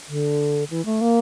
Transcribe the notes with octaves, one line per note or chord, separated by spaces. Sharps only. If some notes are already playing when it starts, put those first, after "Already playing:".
D3
E3
A3
A#3